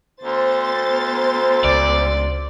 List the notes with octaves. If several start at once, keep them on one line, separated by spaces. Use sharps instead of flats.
D2 B3 C5 A6
C#2 D5